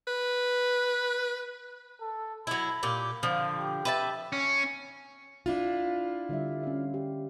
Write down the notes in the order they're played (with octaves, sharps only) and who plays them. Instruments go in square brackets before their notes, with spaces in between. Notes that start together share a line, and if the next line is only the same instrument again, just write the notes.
[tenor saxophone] B4
[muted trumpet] A4
[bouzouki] F#3 E4 [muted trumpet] B5
[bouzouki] A#2 G4
[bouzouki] D3 F3 [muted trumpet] F5
[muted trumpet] G4
[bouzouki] B4 E5 A5
[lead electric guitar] C#4
[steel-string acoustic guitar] D4 E4 F4
[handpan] D3 G3 E5
C#4 F5
G4